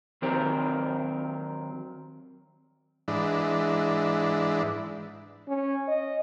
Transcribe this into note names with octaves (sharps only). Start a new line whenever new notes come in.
D#3 F#3 C4 G4 A#4 C5
G#2 E3 D4
C#4
D#5